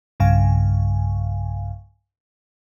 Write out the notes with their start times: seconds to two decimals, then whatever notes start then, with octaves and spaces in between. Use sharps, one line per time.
0.20 B1 G2 C#3 F5 G#5